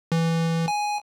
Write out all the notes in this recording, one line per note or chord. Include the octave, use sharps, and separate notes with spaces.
E3
G#5